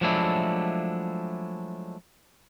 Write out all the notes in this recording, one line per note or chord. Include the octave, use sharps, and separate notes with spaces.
F3 F#3 G#3 A3 D4 E4